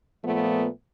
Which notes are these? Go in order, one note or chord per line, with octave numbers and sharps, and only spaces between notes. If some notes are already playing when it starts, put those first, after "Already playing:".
A#2 F3 A3 B3